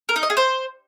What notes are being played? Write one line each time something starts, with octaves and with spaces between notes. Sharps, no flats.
A#4
D#4
D#5
G#4
C5